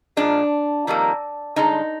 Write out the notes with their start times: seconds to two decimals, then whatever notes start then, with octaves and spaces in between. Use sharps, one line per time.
0.17 A#2 F3 G#3 D4
0.87 F2 D#3 G3 A#3
1.56 G2 D3 G#3 D#4